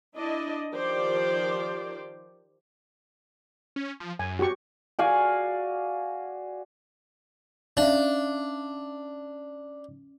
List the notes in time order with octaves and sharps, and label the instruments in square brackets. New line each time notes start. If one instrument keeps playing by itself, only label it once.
[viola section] D4 E4 D5 D#5
D#3 F3 F4 G4 C5 D5
[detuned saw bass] C#4
F3
[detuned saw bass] F#2 [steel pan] G#5
[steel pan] F#4 G4 C#6
[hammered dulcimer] F#4 D5 F5 G#5
[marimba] C#4 E5 F5 [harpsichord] D4